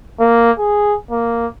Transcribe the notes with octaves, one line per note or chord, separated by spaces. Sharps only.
A#3
G#4
A#3